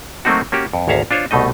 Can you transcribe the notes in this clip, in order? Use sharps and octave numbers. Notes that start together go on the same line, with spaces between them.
F#3 A3 A#3 C4 D#4 F#4
A#3 C#4 F#4 G4
F2
G#1 D2 C#5 E5 F5 A#5
D4 F4 C5 C#5
C2 B2 A3 D#4 D#5